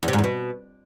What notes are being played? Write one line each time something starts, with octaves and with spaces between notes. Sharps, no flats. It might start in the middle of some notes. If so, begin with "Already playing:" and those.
E2
C3
G#2
E2
B2